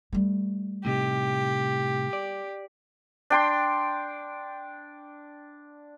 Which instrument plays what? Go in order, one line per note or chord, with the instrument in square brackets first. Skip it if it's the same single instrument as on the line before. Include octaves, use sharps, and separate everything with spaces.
[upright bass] G3 A3
[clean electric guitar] A2 C3 D#4 [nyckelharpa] G4
[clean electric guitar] D5
[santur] D4 G5 C6